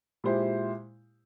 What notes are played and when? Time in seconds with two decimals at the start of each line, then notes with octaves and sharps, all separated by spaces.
0.24 A#2 G#3 E4 G4 C5